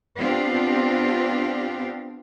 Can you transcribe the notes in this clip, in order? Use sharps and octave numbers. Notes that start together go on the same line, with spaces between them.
B3 C4 D4 F4 G4